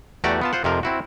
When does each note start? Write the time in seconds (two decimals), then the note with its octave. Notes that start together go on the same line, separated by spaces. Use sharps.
0.24 E2 A3 F#4 G4 D5 A#5
0.41 B3 F4 A5
0.53 F4 C5 F#5
0.64 F2 C3 F3 A#4
0.83 C4 E4 F#4